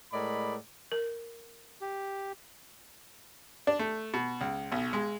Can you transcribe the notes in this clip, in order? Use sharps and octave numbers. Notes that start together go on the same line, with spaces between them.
A2 G#3 A#4 D5 D#5 B5
A#4
G4
D4
A3
B2
C#2
B1
G#3